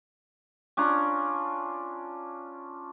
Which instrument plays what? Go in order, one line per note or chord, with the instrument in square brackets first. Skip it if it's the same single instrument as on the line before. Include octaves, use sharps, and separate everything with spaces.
[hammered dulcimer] C#4 D4 F4 A#5